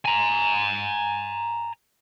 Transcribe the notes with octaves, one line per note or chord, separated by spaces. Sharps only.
G#5 A#5